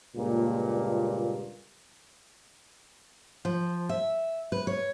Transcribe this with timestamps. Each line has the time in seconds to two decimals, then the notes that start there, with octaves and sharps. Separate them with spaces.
0.16 C#2 G2 A#2
3.45 F3
3.89 E5
4.52 B4
4.67 C#5